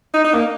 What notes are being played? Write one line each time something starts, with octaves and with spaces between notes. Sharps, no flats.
D#4
D#4
A#3